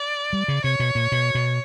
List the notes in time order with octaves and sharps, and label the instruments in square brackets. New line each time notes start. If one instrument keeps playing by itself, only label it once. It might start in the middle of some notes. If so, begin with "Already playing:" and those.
Already playing: [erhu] D5
[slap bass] G3
C#3
[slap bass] C3 [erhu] C#5
[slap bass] B2
A#2
B2
B2